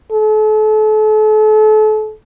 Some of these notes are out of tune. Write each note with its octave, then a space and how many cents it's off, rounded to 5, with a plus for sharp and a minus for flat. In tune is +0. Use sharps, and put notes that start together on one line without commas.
A4 -35